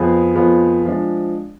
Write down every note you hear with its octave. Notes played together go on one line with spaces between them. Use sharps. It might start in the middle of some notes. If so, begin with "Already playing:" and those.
Already playing: F2 F3 B3 F4 G#4
F2 F3 B3 F4 G#4
F3 G#3 D4